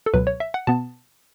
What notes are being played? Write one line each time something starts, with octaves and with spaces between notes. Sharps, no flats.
A4
C#2 B2 F#3 B4
C#5
E5
F#5
B2 B3 A5